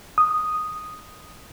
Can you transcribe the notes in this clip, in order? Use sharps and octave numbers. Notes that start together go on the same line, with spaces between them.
D#6